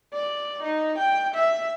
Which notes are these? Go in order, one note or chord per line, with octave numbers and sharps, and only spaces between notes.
D5
D#4
G5
E5